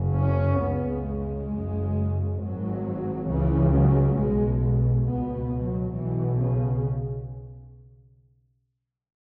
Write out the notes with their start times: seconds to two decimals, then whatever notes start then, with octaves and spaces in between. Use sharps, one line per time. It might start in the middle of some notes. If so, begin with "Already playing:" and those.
Already playing: F#1 F#2 C#3
0.17 C#4
0.61 C#2 C#3 B3
1.05 G#3
1.50 F#1 F#2 C#3
2.38 G#1 G#2 F#3
3.28 C#2 C#3 E3
3.72 F#3
4.17 B1 B2 G#3
5.06 C#2 B2 B3
5.35 B3
5.65 F#3
5.94 B1 B2 E3
6.39 C#3